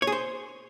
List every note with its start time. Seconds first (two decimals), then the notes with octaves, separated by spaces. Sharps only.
0.02 C#5
0.07 G#4
0.12 C5